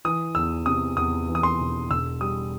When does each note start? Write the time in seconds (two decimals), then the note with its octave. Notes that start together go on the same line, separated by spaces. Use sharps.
0.05 E3 D#6
0.35 E2 E6
0.66 C3 D#6
0.97 E2 D#6
1.29 E3
1.35 D#6
1.43 C6
1.60 E1
1.90 E1 E6
2.21 G3 D#6